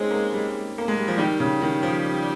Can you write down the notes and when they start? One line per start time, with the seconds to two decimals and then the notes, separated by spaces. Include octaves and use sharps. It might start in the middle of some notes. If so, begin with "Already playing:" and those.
Already playing: G#3 C4 C#4 D#4
0.11 A#3
0.33 G3
0.78 A#3
0.88 G#3
0.98 G3
1.08 F3
1.18 D#3 G3
1.40 C#3
1.62 D#3
1.83 F3